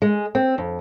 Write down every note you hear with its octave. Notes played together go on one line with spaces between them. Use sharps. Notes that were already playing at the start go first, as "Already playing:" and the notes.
G#3
C4
F2